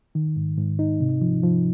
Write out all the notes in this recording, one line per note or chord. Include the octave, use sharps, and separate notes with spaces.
D#3
G#2
G#2
D#4
C3
F3
F3